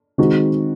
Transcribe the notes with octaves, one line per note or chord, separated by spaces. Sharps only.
D#3 G#3 C4 D#4 F#4